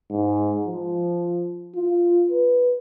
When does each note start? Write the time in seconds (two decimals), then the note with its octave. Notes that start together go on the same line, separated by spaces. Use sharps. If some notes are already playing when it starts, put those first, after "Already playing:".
0.11 G#2
0.67 F3
1.75 F4
2.31 B4